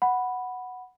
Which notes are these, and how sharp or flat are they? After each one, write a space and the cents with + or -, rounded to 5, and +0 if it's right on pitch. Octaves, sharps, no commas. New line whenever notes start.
F#5 +0 B5 +0